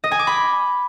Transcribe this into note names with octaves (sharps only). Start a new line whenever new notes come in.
D#5
G#5
D6
B5